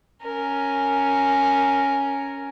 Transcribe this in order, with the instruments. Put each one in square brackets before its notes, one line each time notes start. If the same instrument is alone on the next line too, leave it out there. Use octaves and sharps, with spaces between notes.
[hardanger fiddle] C#4 A#4